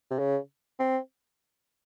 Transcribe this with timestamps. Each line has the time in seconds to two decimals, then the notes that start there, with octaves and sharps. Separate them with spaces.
0.11 C3
0.19 C#3
0.79 C4